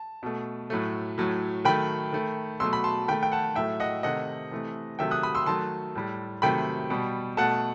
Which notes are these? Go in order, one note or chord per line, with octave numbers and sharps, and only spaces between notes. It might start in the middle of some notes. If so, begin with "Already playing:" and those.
Already playing: A5
B2 A3
A2 F#3 A3
A2 F#3 A3
D#3 F#3 A3 G5 B5
D#3 A3
B2 F#3 A3 C6 E6
B5
A5 C6
D#3 A3 G5 B5
G5
F#5 A5
A2 F#3 A3 E5 G5
D#5 F#5
C3 D#3 A3 D#5 F#5
C3 E3 A3
C3 D#3 F#3 A3 E5 G5
D#6 F#6
B5 D#6
C6 E6
D#3 F#3 A3 A5 C6
A2 G3
C3 D#3 F#3 A3 G5 B5
B2 G3
B2 A3 F#5 A5